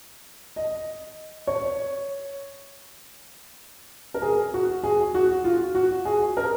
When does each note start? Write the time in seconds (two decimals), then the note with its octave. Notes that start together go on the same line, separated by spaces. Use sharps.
0.56 D#5
1.47 C#5
4.14 A#4
4.22 G#4
4.54 F#4
4.83 G#4
5.14 F#4
5.44 F4
5.75 F#4
6.05 G#4
6.37 A#4